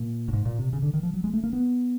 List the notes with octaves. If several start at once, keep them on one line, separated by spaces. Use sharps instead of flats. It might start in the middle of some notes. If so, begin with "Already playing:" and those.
Already playing: A#2
A2
G#2
A#2
C3
C#3
D3
D#3
F3
F#3
G#3
A3
A#3
B3